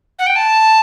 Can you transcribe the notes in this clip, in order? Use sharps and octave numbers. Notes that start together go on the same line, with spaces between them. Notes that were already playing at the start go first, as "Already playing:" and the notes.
F#5
G5
A5